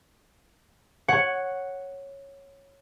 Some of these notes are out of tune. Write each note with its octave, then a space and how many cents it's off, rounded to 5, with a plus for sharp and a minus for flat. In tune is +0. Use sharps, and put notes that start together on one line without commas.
C#5 -5 F#5 +0